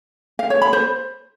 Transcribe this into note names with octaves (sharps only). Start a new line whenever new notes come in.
F5
C#5
B5
C5